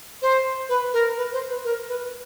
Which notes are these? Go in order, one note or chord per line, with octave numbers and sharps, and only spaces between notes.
C5
B4
A#4
B4
C5
B4
A#4
B4